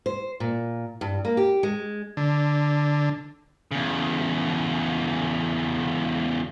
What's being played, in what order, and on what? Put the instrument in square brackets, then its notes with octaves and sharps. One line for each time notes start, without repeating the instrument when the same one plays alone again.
[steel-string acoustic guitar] C5
A#2
G2
A#3
G4
G#3
[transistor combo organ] D3
[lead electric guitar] E2 C#3